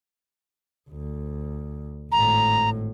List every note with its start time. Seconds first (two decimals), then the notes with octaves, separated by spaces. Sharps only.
0.90 D2
2.12 G#1 A2 A#5